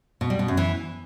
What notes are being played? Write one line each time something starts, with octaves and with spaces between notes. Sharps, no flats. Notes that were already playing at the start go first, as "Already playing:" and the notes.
B2
G3
B2
F#2
E3